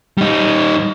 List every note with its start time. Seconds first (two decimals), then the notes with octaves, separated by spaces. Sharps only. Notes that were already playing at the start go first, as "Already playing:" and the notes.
0.18 G3 D#4